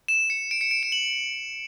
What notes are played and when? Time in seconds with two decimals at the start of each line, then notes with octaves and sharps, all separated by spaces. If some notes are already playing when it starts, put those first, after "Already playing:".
0.08 E7
0.30 C#7
0.51 D7
0.61 C#7
0.71 D7
0.83 E7
0.92 F#7